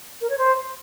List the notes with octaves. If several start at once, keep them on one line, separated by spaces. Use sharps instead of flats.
A#4
C#5
C5